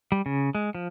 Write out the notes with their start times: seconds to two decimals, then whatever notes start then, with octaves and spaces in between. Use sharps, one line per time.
0.12 G3
0.26 C#3
0.55 G#3
0.75 F3